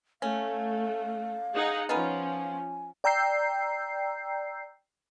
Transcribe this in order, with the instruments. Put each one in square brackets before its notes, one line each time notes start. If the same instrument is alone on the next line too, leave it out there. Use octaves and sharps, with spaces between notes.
[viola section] A3 [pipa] C#4 [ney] F5
[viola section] D#4 G#4 F#5
[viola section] F3 C#4 [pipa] B3 D#4 F4 [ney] G#5
[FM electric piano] D5 G5 A#5 E6 G6 C7